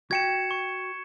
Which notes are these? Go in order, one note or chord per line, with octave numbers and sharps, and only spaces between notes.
F#4 G5 G#6 C#7 E7
C#6